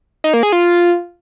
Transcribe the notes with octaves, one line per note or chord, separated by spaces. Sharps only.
D#4
A#3
G#4
F4